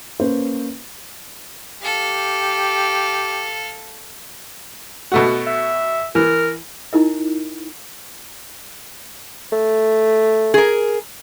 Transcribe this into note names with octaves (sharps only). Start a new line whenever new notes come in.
A#3 C#4 B4 C5
G4 A4 F5
B2 A3 F#4
E5
E3 A#4
D#4 E4 A#4 D#5
A3
G#4 A#4